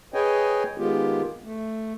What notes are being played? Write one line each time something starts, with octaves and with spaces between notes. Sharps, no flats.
G#4 B4 C#5 D#5 G5 G#5
D#3 G#3 B3 F4 G4
A3